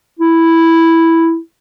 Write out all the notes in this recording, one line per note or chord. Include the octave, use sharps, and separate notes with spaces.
E4